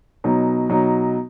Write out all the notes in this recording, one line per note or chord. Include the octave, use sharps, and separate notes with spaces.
B2 F#3 D#4
B2 F#3 D#4